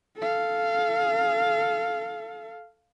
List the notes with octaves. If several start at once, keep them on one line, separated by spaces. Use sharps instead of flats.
A4 F5